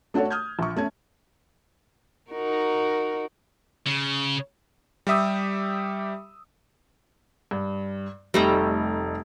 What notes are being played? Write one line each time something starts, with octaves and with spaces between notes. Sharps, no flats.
A3 D4 F#4 A4 C#5
D#6 F6 G6 G#6
A#1 C#6
A3 C#4 G#6
D#4 F#4 A#4
C#3
G3 G4 E5 D#6 E6
G2
F1 G3 A3 D#4 A#5